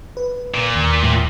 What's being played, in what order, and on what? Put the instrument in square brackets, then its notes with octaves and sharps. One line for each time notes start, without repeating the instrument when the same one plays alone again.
[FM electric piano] B4
[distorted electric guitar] A#2
[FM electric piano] D#2
[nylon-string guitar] A2